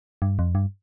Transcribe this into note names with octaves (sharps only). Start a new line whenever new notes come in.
G2
F2
G2